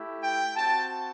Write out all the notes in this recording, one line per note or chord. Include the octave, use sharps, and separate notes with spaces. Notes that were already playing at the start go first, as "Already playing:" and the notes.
Already playing: A3 E4 G4
G5
C4 F#4 A5